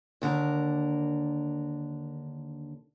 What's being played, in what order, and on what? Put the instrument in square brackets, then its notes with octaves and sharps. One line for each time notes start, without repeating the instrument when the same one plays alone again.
[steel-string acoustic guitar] D#2 D3 A#4